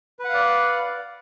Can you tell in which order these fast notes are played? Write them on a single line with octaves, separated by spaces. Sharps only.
B4 F#5 F5 D5